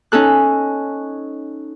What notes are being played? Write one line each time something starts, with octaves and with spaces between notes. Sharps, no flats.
C#4 D#4 A4 F#6